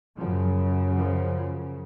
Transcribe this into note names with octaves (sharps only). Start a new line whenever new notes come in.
F#2 C#3 F3
F3